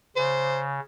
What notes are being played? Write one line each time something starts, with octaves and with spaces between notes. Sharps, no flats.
C#3 C5